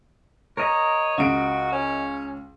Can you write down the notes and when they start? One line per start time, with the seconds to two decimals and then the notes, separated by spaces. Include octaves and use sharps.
0.57 A#4 C#5 D#5 A#5
1.18 C#2 F#4 D7
1.72 C#4